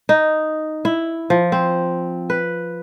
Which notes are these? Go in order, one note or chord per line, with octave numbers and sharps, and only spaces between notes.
D#4
E4
F3
C4
B4